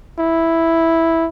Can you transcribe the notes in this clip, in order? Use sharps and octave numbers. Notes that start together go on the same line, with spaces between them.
E4